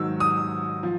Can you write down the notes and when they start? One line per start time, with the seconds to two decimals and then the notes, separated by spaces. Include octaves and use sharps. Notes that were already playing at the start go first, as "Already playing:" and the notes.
Already playing: G#2 D#3 F#3 E6
0.20 D#6
0.83 F3